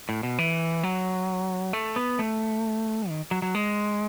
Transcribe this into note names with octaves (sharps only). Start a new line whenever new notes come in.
A2
B2
E3
F#3
A3
B3
A3
D#3
F#3
F#3
G#3